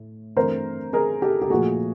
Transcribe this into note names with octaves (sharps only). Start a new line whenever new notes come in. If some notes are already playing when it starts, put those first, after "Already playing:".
Already playing: A2
G2 E3 A3 C4 A#4 C5
G#4 A#4
G4 A4
G4
A#2 F3 A3 F#4 G#4